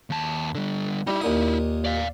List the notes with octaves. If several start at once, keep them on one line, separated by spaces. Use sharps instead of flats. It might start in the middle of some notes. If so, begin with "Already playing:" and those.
D#2 A5
D3 G3
G3 D#4 E4
D#2 A#2 D#6
D5 F5